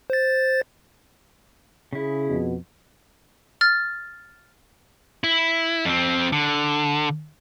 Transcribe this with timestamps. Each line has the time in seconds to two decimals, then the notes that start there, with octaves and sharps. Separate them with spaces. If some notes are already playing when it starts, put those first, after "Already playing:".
0.10 C5 A6
1.93 C#3 E4 G#4
2.28 F2 B2
3.61 F6 A6
5.24 E4
5.85 F2 C4
6.32 D3